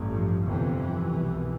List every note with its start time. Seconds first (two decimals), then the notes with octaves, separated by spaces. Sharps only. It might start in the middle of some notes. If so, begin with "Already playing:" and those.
Already playing: A1 G2
0.10 F3
0.43 G1 F2 C3 E3
0.76 E3
1.08 C2 B2